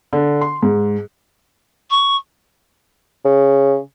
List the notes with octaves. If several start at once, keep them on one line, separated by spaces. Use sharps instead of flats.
D3
C6
G#2
C#6
C#3